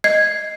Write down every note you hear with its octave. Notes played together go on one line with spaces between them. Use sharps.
D#5 G#6 C7